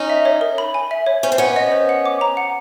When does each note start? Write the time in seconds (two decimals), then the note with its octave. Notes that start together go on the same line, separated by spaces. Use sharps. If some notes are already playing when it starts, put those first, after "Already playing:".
Already playing: C#4 D#4
0.10 E5
0.25 C#5
0.41 A#4
0.58 B5
0.74 G#5
0.91 E5
1.06 C#5
1.23 C#4 C5
1.32 C4
1.38 B3 C#4 F#5
1.56 D#5
1.72 C5
1.89 F#5
2.05 D6
2.21 A#5
2.37 F#5